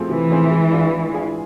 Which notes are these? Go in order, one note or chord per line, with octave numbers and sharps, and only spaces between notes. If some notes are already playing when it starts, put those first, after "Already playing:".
Already playing: F3 A3 C4 G#4
C3 E3
F3 A3 C4 G#4
G#3
D4 F4 G#4
G#3
D4 F4 G#4